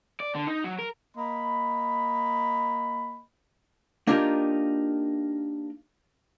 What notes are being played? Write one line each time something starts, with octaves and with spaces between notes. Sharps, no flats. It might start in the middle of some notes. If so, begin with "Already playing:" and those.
D5
D3
D#4
F#3
A#4
A#3 D#5 B5
A#3 D4 D#4 F4 G4 A#4